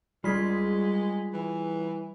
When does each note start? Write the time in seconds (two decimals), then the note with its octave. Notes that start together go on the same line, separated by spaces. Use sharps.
0.24 G3 G#3 F4 G#4 B6
1.33 E3